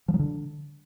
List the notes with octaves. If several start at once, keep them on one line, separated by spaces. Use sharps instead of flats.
F3
F#3
D3